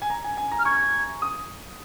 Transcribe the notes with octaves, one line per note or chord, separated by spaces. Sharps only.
G#5
A#5
G#5
G#5
A#5
F6
C#6 G#6
D#6